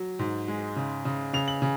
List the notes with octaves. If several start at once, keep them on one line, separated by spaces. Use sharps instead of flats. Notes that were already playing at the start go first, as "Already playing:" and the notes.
Already playing: F#3
G#2
G#3
C#3
C#3
C#3 F7
F#7
C#3